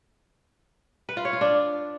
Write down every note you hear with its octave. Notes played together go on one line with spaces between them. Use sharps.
B4
F4
C#5
F4
D4